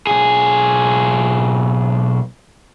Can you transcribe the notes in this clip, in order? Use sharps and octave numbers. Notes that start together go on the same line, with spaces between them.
B1 G#4